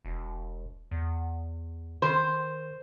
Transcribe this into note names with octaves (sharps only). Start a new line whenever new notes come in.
E1
E2
D#3 C5